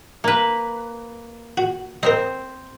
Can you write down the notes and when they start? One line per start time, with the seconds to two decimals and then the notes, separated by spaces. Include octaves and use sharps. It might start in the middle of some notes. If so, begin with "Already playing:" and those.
0.24 A#3 B4
1.57 F#4
2.03 C4 A#4 C5 D#5